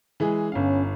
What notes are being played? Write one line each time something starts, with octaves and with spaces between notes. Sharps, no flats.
E3 G#3 G#4
G1 C#4 F5